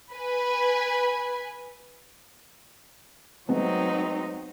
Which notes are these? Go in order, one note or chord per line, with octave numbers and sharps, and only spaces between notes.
B4 G#5
F#3 G#3 A3 B3 C4 D#4